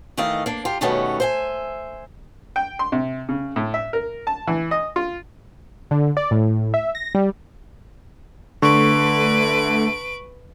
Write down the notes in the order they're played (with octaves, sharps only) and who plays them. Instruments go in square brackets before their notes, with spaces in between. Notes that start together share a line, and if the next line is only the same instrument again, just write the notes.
[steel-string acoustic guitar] D#3 E3 A3 D#5 F5
A#3 D4
F4 G4
B2 D#3 G3 A3 B3 C#4
C5 E5 G#5
[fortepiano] G5
C6
C3
C#3
A2
E5
A#4
A5
E3
D#5
F4
[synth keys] D3
D5
A2
E5
A#6
G3
[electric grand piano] D3 [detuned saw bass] A3 [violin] B4 D7 [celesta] C#6